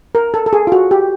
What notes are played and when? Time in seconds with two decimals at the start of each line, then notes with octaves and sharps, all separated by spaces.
0.15 A#4
0.34 A4
0.46 A4
0.53 G#4
0.67 F4
0.72 F#4
0.91 G4